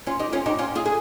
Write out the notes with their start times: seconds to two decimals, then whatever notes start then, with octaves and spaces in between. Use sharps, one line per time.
0.07 C#4 F4
0.19 D#4 G4
0.33 C#4 F4
0.46 D#4 G4
0.59 C#4 F4
0.75 F4 G#4
0.86 G#4